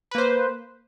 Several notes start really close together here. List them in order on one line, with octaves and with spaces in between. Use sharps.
B4 A#3 C5